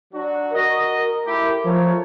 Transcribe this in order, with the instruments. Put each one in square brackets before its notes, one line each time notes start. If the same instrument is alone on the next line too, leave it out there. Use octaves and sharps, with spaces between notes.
[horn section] F#3 D4 F#4
[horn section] F#4 D#5 [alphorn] A#4
[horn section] A3 E4 G4
[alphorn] F3 [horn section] A3 A#4 C#5